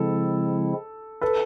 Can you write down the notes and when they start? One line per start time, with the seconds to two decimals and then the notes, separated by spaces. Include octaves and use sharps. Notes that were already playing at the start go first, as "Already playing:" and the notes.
Already playing: C#3 F3 G#3 C4 E4 A4
1.21 A4 B4